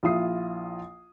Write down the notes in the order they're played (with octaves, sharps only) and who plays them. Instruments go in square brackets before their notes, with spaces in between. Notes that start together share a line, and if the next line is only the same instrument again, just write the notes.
[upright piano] A#1 E4 F4 D#6 C7